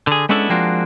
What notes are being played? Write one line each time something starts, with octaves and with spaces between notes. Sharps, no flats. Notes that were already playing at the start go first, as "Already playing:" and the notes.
D3 G#4
G#3 B3 C#4 D4 E4 A4
F3 G#3 A#3 C4 D4 F#4